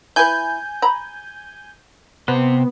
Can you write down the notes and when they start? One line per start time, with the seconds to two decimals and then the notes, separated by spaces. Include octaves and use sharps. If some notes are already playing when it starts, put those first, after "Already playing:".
0.16 E4 B4 G#5 G6
0.82 A#5 B5
2.28 C3 B3 C5